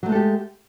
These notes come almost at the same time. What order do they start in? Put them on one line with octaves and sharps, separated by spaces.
F#3 A3 G#3 A4 G4